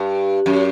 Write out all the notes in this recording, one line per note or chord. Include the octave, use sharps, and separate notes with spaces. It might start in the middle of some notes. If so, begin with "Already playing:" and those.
Already playing: G2
F#2